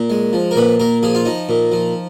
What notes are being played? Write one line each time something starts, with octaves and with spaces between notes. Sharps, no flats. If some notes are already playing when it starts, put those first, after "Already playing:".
Already playing: A#2
G#3
F3
A#4
A#2 B4
A#2 A#4
F3 G#4
F4
F3 D#4
A#2
F3